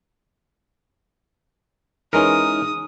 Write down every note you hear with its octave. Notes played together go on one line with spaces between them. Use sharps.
E3 G#3 C#4 D#4 A#4 D#6